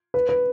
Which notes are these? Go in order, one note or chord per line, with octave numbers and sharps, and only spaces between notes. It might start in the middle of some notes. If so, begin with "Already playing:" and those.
B4
B4